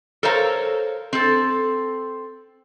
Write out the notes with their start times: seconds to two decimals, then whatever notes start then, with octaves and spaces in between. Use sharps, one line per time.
0.23 A4 A#4 C5 C#5 F5 A#5
1.13 C4 A4